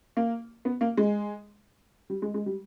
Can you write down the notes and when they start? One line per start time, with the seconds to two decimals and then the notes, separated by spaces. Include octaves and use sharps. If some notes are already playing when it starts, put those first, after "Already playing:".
0.17 A#3
0.65 B3
0.81 A#3
0.97 G#3
2.10 G3
2.22 G#3
2.34 G#3
2.46 G3